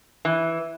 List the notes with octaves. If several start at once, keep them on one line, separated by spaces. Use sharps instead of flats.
E3